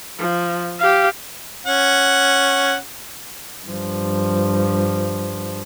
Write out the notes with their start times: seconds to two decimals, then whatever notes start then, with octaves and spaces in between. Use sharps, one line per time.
0.18 F3
0.79 G4 F5
1.67 C#4 F#5
3.66 G2 F3